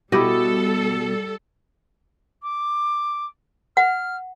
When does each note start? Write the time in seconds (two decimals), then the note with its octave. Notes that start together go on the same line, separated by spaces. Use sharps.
0.12 B2 G3 B3 E4 F#4 G4 A4 D#5
2.43 D6
3.77 F#5 F6